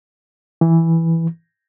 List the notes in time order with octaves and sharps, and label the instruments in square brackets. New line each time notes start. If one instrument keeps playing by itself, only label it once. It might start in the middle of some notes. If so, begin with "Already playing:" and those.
[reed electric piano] E3